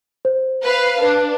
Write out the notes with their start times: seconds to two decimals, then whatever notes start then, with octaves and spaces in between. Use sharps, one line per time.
0.25 C5
0.63 B4 F5
1.01 D4 B4